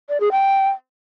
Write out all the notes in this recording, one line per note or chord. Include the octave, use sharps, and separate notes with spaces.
D5
G#4
G5